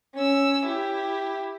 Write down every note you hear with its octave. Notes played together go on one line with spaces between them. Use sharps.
C#4 E6
E4 G4